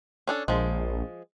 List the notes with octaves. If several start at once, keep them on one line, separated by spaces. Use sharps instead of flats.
C#4 D4 A4
A#1 F3 G#3